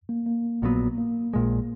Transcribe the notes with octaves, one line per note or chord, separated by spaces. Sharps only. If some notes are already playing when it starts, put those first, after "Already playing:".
A#3
A#3
A#1 A#2 F#3 B3
A#3
A#1 A#2 G#3